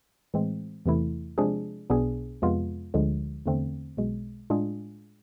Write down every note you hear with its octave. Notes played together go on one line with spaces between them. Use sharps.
A2 E3 G#3 C4
E2 C3 E3 A3 E4
C3 F3 G#3 D4 G#4
B1 B2 B3 D4 G#4
F2 C3 G#3 B3 F4
D2 D3 F3 G#3
E2 D3 A3 C4
B1 B2 G#3
A2 G#3 D4 F4 G#4